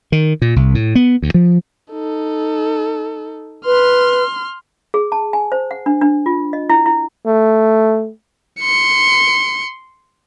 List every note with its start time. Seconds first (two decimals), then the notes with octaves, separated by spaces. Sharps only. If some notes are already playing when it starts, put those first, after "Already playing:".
0.12 D#3
0.42 A#2
0.56 C2
0.75 A2
0.95 B3
1.22 D2
1.34 F3
1.93 D#4 A4
3.66 B4 C6 F6
4.94 G#4
5.12 A5
5.33 G#5
5.52 C5
5.71 F#5
5.86 D4
6.01 D4
6.26 F4
6.53 D#5
6.70 E4
6.86 E4
7.26 A3
8.60 C6 C#7